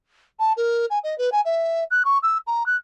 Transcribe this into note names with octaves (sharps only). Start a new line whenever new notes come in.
A5
A#4
G#5
D#5
B4
G#5
E5
F#6
C#6
E6
A#5
F#6